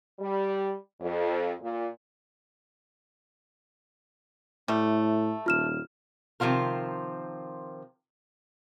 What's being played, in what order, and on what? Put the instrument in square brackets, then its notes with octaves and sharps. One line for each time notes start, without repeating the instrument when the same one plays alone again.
[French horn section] G3
F2
A#2
[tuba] A2 [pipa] G3 A3
[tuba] D#1 [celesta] F4 F6 E7
[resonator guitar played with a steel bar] C3 D#3 F3 F4 A#4